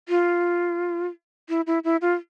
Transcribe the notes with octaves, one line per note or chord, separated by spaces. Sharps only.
F4
E4
E4
E4
F4